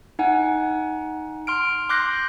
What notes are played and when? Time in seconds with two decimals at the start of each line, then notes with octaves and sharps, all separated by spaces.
0.19 D#4 F#5 G#5
1.47 C6 F6 D7
1.89 C6 D6 F#6 G6 A#6 C7